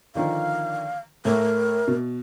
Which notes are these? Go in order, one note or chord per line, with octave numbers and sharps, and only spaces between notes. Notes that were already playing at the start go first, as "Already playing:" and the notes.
D3 D#3 F3 F5
A2 A3 A#4
B2